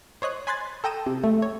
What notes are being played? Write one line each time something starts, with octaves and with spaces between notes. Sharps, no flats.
C5 C#5 D#5 F#6
G#5 B5 C6 F#6 G#6 A6
A4 G5 A#5 D#6 E7
C3
A3
C#5